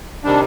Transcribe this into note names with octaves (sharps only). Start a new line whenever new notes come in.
C3 D#3 G3 D4